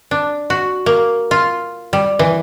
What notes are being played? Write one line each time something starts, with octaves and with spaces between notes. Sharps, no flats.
D4
F#4
A#3
F4
G3
E3